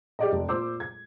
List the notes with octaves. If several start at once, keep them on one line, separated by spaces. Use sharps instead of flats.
G4 D5 D#5
F1
A#2 C5 D6 E6
G#6